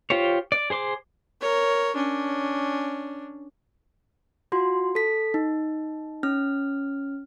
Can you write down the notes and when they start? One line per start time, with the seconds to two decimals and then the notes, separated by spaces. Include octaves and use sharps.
0.10 F4 G4 C5 C#5
0.52 D5
0.70 G#4 C5 C6 D6
1.41 A#4 C#5
1.95 C#4 D4
4.52 F4 F#4 C6
4.95 A4 B6
5.34 D#4
6.23 C#4 F6